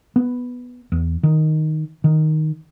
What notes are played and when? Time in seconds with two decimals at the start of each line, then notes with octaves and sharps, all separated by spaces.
0.16 B3
0.92 E2
1.23 D#3
2.04 D#3